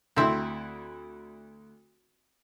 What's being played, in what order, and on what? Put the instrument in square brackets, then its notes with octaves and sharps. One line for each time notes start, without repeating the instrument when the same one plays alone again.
[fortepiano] D2 A3 E4 [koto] C4 E5